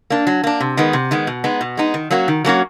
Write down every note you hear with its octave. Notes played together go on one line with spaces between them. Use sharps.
A#3 D4
F#3
A#3 D4
C3
D#3 G#3 B3
C3
D#3 G#3 B3
B2
G#3 B3 D#4
B2
G#3 B3 D#4
D#3
F#3 A#3 C#4 F#4
D#3
F#3 A#3 C#4 F#4